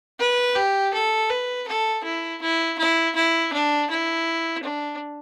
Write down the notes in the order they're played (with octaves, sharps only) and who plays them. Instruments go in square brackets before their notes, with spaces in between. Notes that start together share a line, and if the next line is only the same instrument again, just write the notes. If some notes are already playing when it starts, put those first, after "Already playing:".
[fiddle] B4
G4
A4
B4
A4
E4
E4
E4
E4
D4
E4
D4